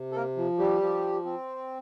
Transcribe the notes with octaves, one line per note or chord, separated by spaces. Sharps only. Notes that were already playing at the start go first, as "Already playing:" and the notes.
Already playing: C3
A4
A#3 A#4
F3
G3 G4
F3
C4